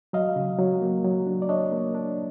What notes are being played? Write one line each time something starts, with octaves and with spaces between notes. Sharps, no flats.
F#3 D#5 F5
C#3
F#3
A#3
F#3
D4
D5
D4 C#5 D#5
A#3
D4